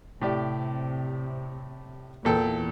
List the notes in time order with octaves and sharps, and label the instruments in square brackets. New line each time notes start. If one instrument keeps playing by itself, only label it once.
[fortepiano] A2 G4 D5 [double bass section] C3
[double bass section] E2 E3 [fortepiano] A#2 A4 G5